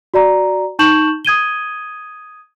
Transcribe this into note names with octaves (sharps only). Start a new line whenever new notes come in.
F#4 D5 A#5
D#4 A5 C#6 G6 E7 F#7
D#6 G#6 D#7 G7